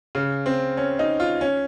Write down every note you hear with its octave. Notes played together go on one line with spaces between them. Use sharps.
C#3
C4
C#4
D#4
F4
C#4